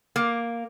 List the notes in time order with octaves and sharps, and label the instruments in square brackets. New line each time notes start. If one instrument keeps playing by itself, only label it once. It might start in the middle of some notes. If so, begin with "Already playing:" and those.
[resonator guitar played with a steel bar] A#3